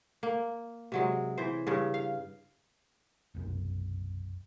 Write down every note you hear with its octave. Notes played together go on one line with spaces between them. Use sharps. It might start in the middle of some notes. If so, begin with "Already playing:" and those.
A#3
C3 F#3 G#3
E3 C5
G2 C#3
F5
F1 B1 F#2